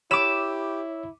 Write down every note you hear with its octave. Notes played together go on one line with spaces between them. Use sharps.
E4 G4 C#5 B5 D6 E6 E7